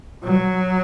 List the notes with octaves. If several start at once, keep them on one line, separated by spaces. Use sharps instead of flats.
F#3